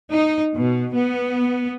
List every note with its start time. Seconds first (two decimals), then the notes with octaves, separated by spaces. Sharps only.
0.10 D#4
0.55 B2
0.94 B3